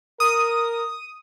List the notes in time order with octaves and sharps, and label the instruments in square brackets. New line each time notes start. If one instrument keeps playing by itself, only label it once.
[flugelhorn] A#4 [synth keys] D#6